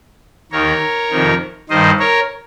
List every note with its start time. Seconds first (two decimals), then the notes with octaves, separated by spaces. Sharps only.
0.52 D#2 D#3 A#4 C#5
1.11 F2 C3 D#3
1.70 G2 D#3 C5 D#5
1.99 A#4 C#5